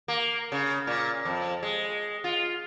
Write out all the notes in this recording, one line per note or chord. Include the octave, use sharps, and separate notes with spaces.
A#3
C#3
A#2
F2
G#3
F4